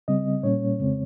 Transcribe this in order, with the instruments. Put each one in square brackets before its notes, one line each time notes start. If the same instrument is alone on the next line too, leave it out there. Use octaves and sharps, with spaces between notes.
[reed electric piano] C#3 G3 C4 D#5
A#2 G3 A#3 C#4 C#5
F2 C#3 G#3 C4